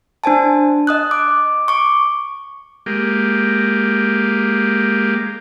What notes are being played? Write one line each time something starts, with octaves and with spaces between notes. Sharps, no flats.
D4 C5 G#5 A5
D#5 D#6 F#6
D6
C#6 D6
G#3 A#3 G4